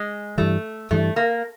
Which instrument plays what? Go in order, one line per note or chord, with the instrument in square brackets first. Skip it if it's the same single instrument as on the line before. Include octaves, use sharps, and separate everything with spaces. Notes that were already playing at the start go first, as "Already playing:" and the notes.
Already playing: [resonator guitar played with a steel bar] G#3
[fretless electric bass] G2 E3 G3 [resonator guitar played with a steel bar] A3
[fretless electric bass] G2 E3 G3 [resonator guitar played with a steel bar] A3
[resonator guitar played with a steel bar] A#3